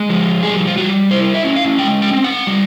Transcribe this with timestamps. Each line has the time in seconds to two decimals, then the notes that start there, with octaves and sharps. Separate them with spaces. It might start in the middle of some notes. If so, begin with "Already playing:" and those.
Already playing: G#3
0.09 F3
0.43 G3 G#4
0.67 F4
0.77 G3 F#4
1.11 E4 C5
1.34 E5
1.45 C#4
1.56 F5
1.79 G#3 G5
2.02 G5
2.13 C4
2.24 F#5
2.47 G3